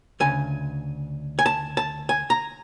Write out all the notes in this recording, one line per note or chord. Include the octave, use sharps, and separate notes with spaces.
D2 C#3 G#5
G#5
A5
A5
G#5
A#5